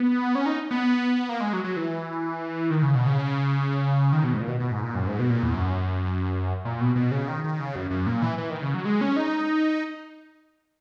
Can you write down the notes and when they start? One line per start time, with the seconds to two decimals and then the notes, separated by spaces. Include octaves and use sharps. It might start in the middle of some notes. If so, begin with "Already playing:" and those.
Already playing: B3
0.35 C#4
0.46 D#4
0.71 B3
1.29 A#3
1.40 G#3
1.53 F#3
1.64 F#3
1.76 E3
2.70 D#3
2.82 C#3
2.95 B2
3.06 C#3
4.12 D#3
4.24 B2
4.33 G#2
4.40 A#2
4.48 B2
4.60 B2
4.71 G#2
4.83 A#2
4.95 F#2
5.07 G#2
5.19 B2
5.30 A#2
5.43 E2
5.54 F#2
6.65 A#2
6.81 B2
6.96 B2
7.11 C#3
7.28 D#3
7.44 D#3
7.60 C#3
7.76 F#2
7.91 F#2
8.07 A#2
8.22 E3
8.38 E3
8.50 D#3
8.62 C#3
8.74 F#3
8.85 G#3
9.01 C#4
9.16 D#4